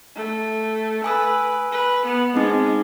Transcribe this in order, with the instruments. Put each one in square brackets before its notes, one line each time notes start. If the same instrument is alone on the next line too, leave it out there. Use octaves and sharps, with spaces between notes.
[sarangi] A3
[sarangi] B4 [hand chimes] G#5 D#6 E6
[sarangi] B4
B3
[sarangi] G#3 [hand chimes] C4 D#4